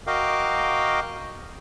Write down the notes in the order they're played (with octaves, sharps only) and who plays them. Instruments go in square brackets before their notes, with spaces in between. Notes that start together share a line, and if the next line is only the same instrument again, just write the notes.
[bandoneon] F#4 A#4 D#5 F5 G5 D6